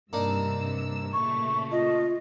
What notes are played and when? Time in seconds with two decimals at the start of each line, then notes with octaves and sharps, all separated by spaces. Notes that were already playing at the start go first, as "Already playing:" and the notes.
0.13 G2 C3 A#3 D4 D#4 E6
1.13 A#2 C#3 A3 C#6
1.72 F4 D#5